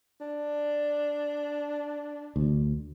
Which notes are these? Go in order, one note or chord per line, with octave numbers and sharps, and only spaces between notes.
D4
D2